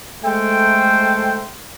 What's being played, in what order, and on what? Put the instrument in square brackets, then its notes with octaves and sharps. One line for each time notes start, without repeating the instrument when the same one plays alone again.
[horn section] G#3 A3 A4 C5 G5